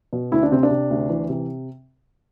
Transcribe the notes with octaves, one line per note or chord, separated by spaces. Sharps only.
B2
D2 E4
D4
C3 C4
D4
C3
D2
E3
C3